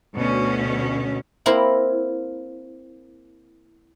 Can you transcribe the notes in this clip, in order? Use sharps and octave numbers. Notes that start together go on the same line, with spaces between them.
D2 B2 C#4
A#3 C4 E4 A#4